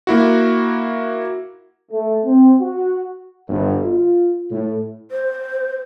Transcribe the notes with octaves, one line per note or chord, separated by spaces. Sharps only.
A#3 E4 F#4
A3
C4
F#4
G1
F4
A2
C5